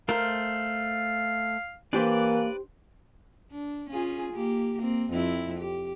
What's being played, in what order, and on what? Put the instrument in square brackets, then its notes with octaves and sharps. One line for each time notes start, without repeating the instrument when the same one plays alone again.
[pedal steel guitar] A3 C5 F6 [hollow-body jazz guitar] A#4 [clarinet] F5
[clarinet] E3 [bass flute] A#3 [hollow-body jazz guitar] D4 G4 C5 [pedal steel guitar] B4 D5
[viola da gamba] D4
C#4 F4 G#4
A#3 G4
A#3 C4
F2 C4 E4
G4